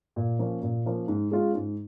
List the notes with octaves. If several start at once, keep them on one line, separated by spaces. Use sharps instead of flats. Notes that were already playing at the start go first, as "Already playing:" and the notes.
A#2
F3 A#3 C#4
A#2
F3 A#3 C#4
G#2
G#3 C#4 F4
G#2